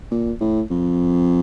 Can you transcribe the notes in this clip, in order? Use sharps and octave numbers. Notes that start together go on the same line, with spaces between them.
A#2
A2
F2